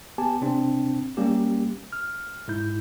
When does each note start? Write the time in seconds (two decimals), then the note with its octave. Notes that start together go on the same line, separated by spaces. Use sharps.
0.18 B3 G4 G#5 A5
0.41 C3 C4 D4 C5
1.17 G3 A#3 C#4 G4
1.93 F6
2.48 G#2 D#4 E4 G6